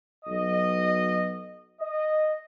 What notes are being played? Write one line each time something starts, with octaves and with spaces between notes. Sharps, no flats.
B1 B2 F#3 D#5
D#5